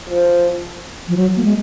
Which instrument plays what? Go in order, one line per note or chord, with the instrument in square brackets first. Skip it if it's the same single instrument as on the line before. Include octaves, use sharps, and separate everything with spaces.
[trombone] F3
[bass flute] F3
F#3
A#3
G#3